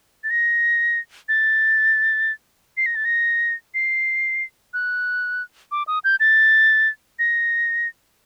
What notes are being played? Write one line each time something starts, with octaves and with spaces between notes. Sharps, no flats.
A6
A#6
A6
C7
A#6
A6
A#6
C7
F#6
D6
D#6
G6
A6
A#6